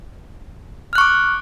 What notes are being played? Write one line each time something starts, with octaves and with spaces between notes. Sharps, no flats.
C#6 D6 F6 F#6